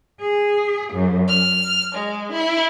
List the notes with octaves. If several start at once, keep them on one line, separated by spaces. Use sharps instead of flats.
G#4
F#2
F6
G#3
E4